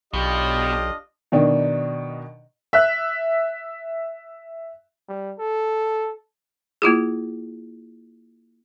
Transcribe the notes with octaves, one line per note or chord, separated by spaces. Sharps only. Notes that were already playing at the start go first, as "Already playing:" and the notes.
B1 B2 D4 F4 G4 D#5
B2 D#3 D4
E5 F#6
G3
A4
A#3 E4 F4 G#4